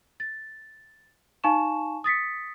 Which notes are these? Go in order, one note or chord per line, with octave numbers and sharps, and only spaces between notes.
A6
D#4 F5 G#5 A5 C#6 E7
D#6 A6 B6 C#7